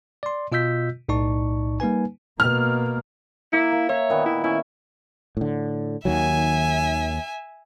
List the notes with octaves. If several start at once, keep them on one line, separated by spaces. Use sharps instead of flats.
D5 C6
B2 F4 D#5 E6 G6 B6
B1 A2 D#4 D5 A5 C#6
G3 A#3 D#4 B4 G#5
B2 A#3 F6
A#3 E4
A#3
C#5 E5
A#2 D#3 B3
E4
C#4 E4 E5
A2 D3
D#2 D#3 F#3 E5 G#5